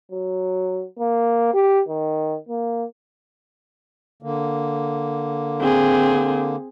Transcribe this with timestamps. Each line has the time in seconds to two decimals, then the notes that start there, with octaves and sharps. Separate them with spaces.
0.12 F#3
0.99 A#3
1.54 G4
1.89 D#3
2.49 A#3
4.23 D3 A#3
5.60 C4 G#4